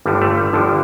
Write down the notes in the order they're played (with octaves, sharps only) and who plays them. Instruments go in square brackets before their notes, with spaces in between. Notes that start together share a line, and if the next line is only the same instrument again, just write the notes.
[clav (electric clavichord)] G1 G2 D3 G3
A3
G3
G1 G2 D3 F3